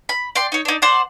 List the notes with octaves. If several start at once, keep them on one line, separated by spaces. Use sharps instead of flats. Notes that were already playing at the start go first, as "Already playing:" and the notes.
B5
D5 G5 C6
D#4 C#5
D4 D#4
C5 D5 F#5